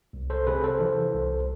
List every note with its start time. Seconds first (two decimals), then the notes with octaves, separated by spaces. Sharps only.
0.13 C2
0.30 A4 C5
0.47 C3 G#4 B4
0.64 A4 C5
0.80 E3
1.14 C2